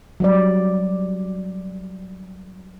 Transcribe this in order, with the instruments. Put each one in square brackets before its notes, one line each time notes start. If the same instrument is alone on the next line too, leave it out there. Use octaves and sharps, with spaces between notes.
[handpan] F#3 G3 D5